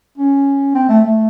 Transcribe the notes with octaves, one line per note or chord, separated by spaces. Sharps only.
C#4
C4
A3
A3